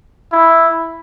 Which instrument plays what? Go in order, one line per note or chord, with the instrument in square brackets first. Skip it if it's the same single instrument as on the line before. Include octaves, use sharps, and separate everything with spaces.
[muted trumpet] E4